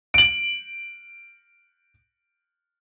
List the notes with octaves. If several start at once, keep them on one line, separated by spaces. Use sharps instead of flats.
D7 F#7